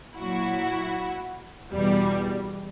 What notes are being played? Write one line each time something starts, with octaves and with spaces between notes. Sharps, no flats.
A#2 F#3 E4 F#4
E2 B2 G3